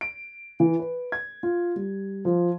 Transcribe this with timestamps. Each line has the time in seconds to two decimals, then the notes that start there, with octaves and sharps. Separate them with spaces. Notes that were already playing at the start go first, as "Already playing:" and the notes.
0.01 D7
0.60 E3
0.79 B4
1.12 G#6
1.43 F4
1.76 G3
2.25 F3